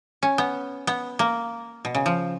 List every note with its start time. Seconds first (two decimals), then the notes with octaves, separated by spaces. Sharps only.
0.23 C#4
0.38 B3
0.87 B3
1.19 A#3
1.85 B2
1.95 C#3
2.06 F3